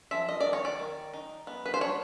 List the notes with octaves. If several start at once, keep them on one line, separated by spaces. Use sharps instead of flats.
F3 E5
D#5
D5
D#3
C#5
D5
D#3
D#4
B3
B4
C5
D4 C#5